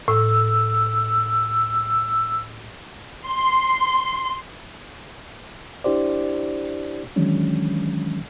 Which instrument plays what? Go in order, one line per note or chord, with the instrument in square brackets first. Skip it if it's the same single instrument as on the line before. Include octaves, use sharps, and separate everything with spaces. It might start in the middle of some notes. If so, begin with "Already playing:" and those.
[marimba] A2 [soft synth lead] E6
[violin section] C6
[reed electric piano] D4 E4 G4 C5 D5
D#3 E3 F#3 G#3 C#4 D4